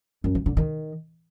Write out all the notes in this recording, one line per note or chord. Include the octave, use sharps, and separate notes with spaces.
F#2
E3
D3
D#3